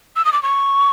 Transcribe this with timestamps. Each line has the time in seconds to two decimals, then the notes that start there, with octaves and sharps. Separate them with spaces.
0.16 E6
0.25 D#6
0.33 D6
0.43 C#6